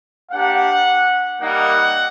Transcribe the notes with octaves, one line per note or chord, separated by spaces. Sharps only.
A#3 D4 G4 F#5
G3 A#3 D#4 F#5